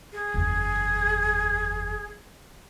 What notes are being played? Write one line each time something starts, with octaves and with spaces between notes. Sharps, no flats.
G#4
F#1 E2